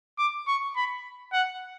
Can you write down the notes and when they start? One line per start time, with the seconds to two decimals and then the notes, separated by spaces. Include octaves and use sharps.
0.19 D6
0.48 C#6
0.76 B5
1.33 F#5